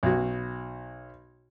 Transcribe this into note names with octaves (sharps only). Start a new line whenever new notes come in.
B1 F#4